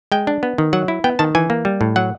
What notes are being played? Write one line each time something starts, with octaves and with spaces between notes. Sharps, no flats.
G#3 G5
D4
B3
D#3
F#3 F#5
E4
B3 G5
D#3 A5
E3 G#5
A#3
G3
A2
F#3 F#5